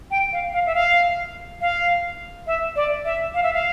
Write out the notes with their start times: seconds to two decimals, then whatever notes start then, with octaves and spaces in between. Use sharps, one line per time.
0.11 G5
0.33 F5
0.53 F5
0.66 E5
0.75 F5
1.61 F5
2.47 E5
2.76 D5
3.05 E5
3.34 F5
3.43 E5
3.54 F5